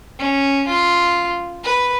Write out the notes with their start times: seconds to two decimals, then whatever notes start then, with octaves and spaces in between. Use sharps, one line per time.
0.19 C#4
0.67 F4
1.64 B4